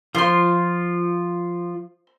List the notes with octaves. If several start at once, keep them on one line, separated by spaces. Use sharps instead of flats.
F3 F4 C5 C6